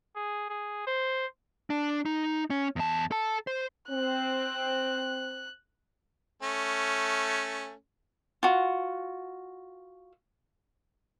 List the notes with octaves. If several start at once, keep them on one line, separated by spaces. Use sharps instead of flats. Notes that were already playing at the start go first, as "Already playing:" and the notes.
G#4
G#4
C5
D4
D#4
C#4
E2 A5
A4 A5
C5
C4 F#6
A3 C#4
F4 F#4